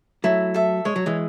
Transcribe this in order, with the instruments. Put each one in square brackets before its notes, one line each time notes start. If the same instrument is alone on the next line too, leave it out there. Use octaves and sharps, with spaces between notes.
[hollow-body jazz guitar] F#3 A3 [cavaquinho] E4
[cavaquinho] A4 E5
[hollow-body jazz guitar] G#3 [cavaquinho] C#5
[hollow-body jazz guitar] F#3
E3 G#3